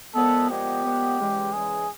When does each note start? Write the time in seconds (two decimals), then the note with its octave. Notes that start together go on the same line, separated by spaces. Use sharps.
0.15 A#2 F3 G#3 B3 A4
0.49 A#2 F3 G#3 B3 G4
0.84 A#2 F3 G#3 B3
1.19 E2 C#3 E3 G#3
1.53 E2 C#3 E3 G#3 G#4